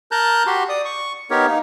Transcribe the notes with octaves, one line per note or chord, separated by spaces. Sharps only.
A#4 A5 A#5 F#6 G6
F#4 G4 C6
D5 D#6
C#6
B3 D#4 G4 A#4 C#5
A#3 D#4